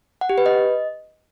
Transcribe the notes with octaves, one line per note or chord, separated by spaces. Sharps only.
F#5
G4
B4
D#5